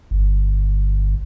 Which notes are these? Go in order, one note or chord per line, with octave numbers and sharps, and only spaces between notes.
G1